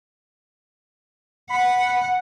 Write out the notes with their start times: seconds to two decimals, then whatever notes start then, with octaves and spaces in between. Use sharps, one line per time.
1.50 F#5 B5